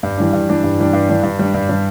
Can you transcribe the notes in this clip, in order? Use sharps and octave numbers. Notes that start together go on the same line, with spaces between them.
G2
E3 G3 D4
G2
E3 G3 D4
G2
E3 G3 D4
G2
E3 G3 D4
G2
G3 D4
G2
G3 D4